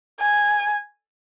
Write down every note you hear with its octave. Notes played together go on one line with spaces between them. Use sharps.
G#5